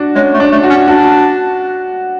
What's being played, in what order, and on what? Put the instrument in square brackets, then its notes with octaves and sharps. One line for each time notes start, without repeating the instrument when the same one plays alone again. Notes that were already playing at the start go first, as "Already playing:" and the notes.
Already playing: [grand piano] D4 F#4
[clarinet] G#3 [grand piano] C#4
[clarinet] A3
[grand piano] D4
[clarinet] A3
[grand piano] F#4
[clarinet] C#4
[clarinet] D4 [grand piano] F#4